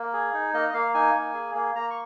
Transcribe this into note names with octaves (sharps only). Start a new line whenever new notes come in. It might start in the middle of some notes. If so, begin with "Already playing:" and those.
Already playing: A#3
G#4
D#4
A#3 D#5
D#5
A#3 F5
D#4 G#5
A#3
G#4
A#3
A#3 A#5
C#6